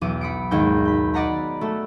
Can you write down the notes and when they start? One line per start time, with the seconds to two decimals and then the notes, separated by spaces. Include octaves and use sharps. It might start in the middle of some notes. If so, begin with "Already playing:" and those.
0.01 B1 E2 D6 D#7
0.21 B5 D#6 C#7 D7
0.51 G#1 D#2 G#3 C#5 D#5 G5
0.85 B5 G6
1.14 D5 D#5 F#5 A#5 B5
1.61 A3 F#4 A4